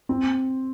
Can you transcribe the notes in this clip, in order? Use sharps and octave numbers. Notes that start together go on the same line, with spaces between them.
C4